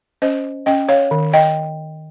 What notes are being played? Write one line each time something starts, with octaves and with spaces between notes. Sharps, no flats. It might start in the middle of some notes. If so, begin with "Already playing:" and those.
C#4 C5 D#5
C#4 D#5 G5
C#5 F5
D#3
D#5 G5